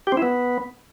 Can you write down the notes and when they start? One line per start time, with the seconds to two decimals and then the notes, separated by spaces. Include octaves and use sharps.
0.07 G4
0.12 C4
0.17 E4
0.22 B3